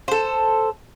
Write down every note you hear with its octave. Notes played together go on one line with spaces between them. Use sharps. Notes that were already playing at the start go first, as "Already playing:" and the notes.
A4 C5